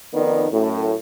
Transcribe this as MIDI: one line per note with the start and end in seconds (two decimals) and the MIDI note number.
0.14 0.46 41
0.14 0.46 51
0.14 0.46 59
0.14 0.46 63
0.14 0.46 74
0.52 0.94 42
0.52 0.94 45